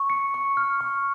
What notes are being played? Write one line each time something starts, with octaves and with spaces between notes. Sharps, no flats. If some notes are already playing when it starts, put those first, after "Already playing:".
Already playing: C#6
C#7
C#6
F6
C#6